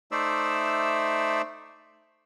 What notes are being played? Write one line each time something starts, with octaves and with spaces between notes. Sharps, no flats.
A3 D#4 C5 D5 E5 E6